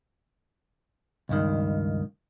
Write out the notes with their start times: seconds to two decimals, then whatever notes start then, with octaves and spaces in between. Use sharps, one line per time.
1.29 C#2 G2 D#3